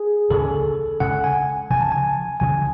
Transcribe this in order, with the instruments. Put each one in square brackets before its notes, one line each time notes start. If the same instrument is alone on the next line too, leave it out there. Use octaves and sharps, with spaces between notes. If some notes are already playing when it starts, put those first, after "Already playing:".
Already playing: [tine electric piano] G#4
[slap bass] D2 C#3 G#3 C#4 [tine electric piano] A4
[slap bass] D2 C#3 G#3 C#4 [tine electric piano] F#5
[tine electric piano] G#5
[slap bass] D2 C#3 F3 [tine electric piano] G#5
[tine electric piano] A5
G#5
[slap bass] D2 C#3 F3 [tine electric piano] G#5